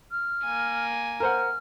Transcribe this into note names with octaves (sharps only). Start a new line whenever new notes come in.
F6
A#3 G#5
A#4 C5 F#5 F6